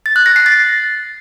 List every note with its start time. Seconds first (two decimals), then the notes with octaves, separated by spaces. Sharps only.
0.06 A6
0.16 F#6
0.26 A#6
0.36 C7
0.46 A6